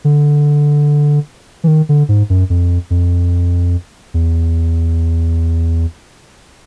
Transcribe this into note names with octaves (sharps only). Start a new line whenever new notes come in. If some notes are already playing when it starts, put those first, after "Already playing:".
D3
E3
D#3
D3
G#2
F#2
F2
F2
E2